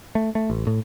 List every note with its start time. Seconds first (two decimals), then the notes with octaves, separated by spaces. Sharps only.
0.15 A3
0.35 A3
0.50 A1
0.67 A2